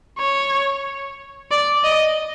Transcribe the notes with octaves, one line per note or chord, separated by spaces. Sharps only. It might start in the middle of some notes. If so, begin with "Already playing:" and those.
C#5
D5
D#5